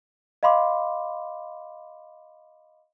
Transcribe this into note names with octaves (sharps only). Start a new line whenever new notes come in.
D#5 F5 B5 C6 D6